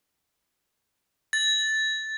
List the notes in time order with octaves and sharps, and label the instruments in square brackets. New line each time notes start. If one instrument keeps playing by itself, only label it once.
[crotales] A6